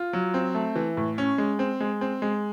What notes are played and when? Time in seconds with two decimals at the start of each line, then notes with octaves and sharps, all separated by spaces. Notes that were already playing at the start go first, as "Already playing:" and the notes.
Already playing: F4
0.13 F#3
0.34 C4
0.55 A3
0.76 E3
0.97 A2
1.18 C#4
1.38 G#3
1.59 C4
1.80 G#3
2.01 C4
2.22 G#3